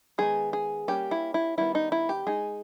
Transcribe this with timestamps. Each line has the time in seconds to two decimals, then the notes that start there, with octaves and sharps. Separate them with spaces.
0.18 D#3 G#3 B3 D#4 G#4
0.53 G#4
0.88 G3 A#3 C#4 G4
1.11 E4
1.34 E4
1.58 D#3 G3 B3 E4
1.75 D#4
1.92 E4
2.09 G4
2.27 G#3 D#4 G#4